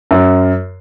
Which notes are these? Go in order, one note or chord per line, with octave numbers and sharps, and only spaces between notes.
F#2